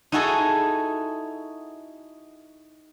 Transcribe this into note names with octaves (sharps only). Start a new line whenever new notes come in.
D#4 E4 F#4 G#4 A4 D#5